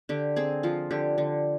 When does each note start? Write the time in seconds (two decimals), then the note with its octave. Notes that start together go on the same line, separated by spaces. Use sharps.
0.09 D3 G4
0.36 C4 G#4
0.63 F3 F4
0.91 D3 G4
1.18 D3